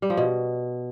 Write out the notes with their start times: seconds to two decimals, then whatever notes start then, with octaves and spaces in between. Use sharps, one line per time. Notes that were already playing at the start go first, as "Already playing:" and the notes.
0.02 G3
0.10 F3
0.17 B2